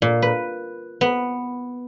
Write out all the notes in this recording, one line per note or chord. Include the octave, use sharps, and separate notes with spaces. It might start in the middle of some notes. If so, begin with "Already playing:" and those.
A#2
B4
B3